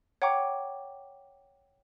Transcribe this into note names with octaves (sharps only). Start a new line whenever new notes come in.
C#5 F#5 G5 A#5 C#6 D6